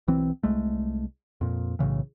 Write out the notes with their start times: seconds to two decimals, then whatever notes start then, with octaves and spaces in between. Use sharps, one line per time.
0.08 B1 E3 C4
0.43 C2 G#3 A3
1.41 F2 A#2
1.79 B1 A2 C#3 E3